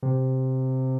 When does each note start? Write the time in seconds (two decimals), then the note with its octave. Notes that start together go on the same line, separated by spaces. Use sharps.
0.03 C3